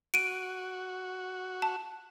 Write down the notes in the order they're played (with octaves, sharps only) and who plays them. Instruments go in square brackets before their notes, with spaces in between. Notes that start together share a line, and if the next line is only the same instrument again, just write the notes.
[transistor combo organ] F#4 [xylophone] D7 D#7
[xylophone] A5